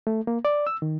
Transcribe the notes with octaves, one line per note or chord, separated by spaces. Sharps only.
A3
A#3
D5
E6
D#3